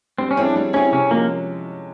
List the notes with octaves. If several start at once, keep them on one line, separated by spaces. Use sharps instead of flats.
G3 C4
C#4
C4 E4 G#4 C#5
D4
G3
C4 C#4 E4 G#4 C#5
C3 C#4
F3 G#3 A#3 C#4